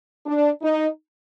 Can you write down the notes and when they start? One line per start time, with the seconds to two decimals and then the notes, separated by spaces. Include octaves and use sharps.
0.26 D4
0.62 D#4